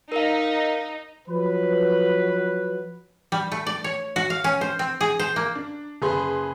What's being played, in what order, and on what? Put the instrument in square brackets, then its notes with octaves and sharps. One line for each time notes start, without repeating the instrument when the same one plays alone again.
[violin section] D#4 [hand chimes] A#4 F5
[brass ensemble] F3 F#3 B4
[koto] G3
A3
D5
C#5
F#4
F5
C#4
C5
C4
G#4
C5
A#3
[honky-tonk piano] D4
F#1 G#4 B4 C6